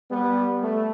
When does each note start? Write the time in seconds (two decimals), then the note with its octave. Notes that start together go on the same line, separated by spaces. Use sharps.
0.11 G3 B3
0.63 A3